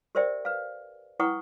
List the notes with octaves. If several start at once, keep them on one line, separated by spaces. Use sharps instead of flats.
G4 A#4 C5 D5 E5 G5
B4 F5
E4 B4 F#5 G5 C#6 D#6